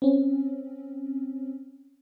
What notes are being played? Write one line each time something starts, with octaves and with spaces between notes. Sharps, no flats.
C4 C#4